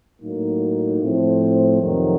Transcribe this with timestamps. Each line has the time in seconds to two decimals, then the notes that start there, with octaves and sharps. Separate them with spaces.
0.22 A2 F#3 A#3 D#4
1.02 A2 F3 A3 C4 E4
1.81 F2 C3 D#3 F#3